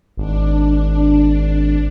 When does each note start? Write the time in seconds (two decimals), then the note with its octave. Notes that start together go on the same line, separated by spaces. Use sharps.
0.17 G#1 D4